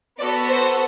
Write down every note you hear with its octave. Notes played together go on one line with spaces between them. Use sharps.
B3 F#4 A4 D5
C5